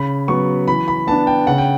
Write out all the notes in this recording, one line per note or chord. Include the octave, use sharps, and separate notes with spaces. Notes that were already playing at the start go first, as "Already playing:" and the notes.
Already playing: C#3 B5
F#3 B3 C#6
E3 B5
B5
B3 D4 A5
G5
C#3 F#5
G5